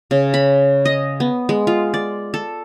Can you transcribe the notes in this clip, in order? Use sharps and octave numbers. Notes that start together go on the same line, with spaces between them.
C#3
B5
D#5
B3
G#3
F4
D5
A4